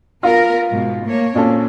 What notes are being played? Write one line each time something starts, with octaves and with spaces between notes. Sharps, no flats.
B3 F4 A#4
G#2 B2
A3 A#3 C#5
A#2 C4 C#4 A4